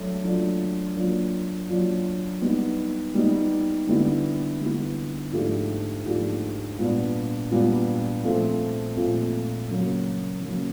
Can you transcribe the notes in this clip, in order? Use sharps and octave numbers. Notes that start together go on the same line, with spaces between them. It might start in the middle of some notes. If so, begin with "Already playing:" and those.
Already playing: F#3 A3 D4
F#3 A3 D4 F4
F#3 A#3 D4 F4
F#3 A#3 D4 F4
G3 B3 D#4
G3 B3 D#4
D3 G3 B3 E4
D3 G3 B3 E4
G#2 F3 A3 D4 G4
G#2 F3 A3 D4 G4
A#2 G3 B3 D4
A#2 G3 B3 D4
A#2 F3 A3 C4
A#2 F3 A3 C4
C#3 F#3 A#3
C#3 F#3 A#3